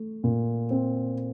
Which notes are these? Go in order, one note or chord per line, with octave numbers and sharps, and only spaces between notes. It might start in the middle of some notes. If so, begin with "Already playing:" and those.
Already playing: A3
A#2
C4